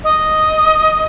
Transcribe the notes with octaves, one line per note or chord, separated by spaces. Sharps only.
D#5